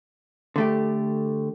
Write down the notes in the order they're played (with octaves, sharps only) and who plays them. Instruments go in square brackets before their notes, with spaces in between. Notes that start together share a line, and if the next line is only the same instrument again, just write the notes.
[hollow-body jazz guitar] D3 A3 G4